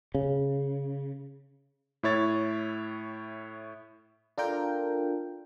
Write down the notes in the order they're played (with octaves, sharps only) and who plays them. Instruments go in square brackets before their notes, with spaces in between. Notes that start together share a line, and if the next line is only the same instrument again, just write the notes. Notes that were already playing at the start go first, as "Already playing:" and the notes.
[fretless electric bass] C#3
[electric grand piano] A2 E4 C#5 A6
[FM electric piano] D4 F4 A4 A#4 G5